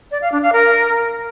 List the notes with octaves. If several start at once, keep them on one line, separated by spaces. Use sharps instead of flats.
D5
F5
D4
F5
A#4